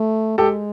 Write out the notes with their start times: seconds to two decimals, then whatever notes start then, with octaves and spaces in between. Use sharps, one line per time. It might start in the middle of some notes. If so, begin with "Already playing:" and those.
Already playing: A3
0.38 G#3 G4 A4